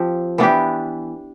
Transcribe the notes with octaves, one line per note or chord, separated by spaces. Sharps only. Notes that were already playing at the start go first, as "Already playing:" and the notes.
Already playing: F3 C4 G4
E3 B3 D4 G4